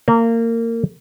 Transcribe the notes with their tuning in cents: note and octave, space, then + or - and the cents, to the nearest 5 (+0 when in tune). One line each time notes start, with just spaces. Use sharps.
A#3 -25